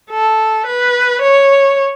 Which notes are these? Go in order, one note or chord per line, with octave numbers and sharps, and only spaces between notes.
A4
B4
C#5